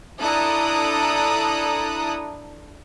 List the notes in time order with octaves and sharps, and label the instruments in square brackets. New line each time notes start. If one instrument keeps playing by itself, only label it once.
[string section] D4 E4 A4 A#5 D#6 F#6